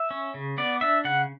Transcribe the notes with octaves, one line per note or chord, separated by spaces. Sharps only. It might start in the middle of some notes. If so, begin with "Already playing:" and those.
Already playing: E5
C#4
C#3
B3 D5
D4 E5
C#3 F#5